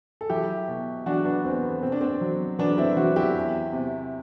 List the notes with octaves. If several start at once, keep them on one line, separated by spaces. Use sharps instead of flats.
A4
F#3 E4 G4
B2
F#3 D4 F#4
B3 D4
E2 C4
B3
B2 C4
D4
C4
F#3
F#3 B3 D4
C4 E4
F#3 D4 F#4
E4 G4
E2
C3